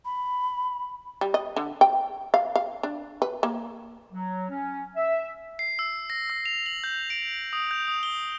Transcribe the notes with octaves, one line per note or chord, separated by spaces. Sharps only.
B5
G3
D#5
D3
G5
F5
F5
D4
B4
A#3
F#3
C#4
E5
C7
E6
A#6
E6
F7
F#7
G6
D7
D#6
G6
D#6
G7